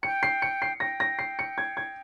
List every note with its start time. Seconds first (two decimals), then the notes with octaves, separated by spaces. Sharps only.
0.03 G5 C#7
0.23 C7
0.42 C#7
0.62 C7
0.80 G5 A#6
1.00 A#6
1.19 C7
1.39 C#7
1.58 G#6
1.77 G#6